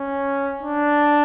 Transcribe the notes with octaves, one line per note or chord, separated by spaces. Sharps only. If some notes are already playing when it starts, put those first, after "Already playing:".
Already playing: C#4
D4